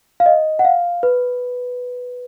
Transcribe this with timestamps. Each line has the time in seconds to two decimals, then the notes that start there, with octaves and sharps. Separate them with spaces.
0.20 F5
0.26 D#5
0.59 F#5
0.65 F5
1.03 B4